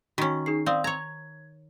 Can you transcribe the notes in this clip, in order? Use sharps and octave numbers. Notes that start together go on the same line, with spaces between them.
D#3 C#4 F#4
D#4 G#4 C7
C4 D5 F5 D#6
C#5 A#5 G#6